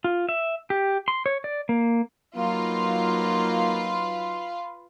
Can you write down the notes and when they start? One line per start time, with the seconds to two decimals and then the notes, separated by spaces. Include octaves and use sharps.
0.04 F4
0.29 E5
0.70 G4
1.08 C6
1.26 C#5
1.44 D5
1.69 A#3
2.36 F#3 A#3 D#4 F4 B4